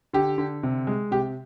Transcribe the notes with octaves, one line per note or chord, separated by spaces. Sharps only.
D3 G4
D3
C3
G#3
C3 G4